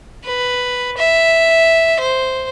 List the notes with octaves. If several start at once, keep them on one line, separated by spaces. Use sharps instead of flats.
B4
E5
C5